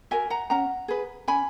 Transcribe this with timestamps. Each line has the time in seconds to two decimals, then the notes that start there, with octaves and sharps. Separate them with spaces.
0.11 F#4 A#4 E5 G#5
0.30 F#5 A#5
0.50 C#4 F#5 A#5
0.88 G#4 B4
1.28 C#4 G#5 B5